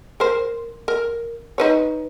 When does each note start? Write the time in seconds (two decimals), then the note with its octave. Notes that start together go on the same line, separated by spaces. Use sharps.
0.20 A#4 C5
0.88 A#4
1.58 D#4 B4 C#5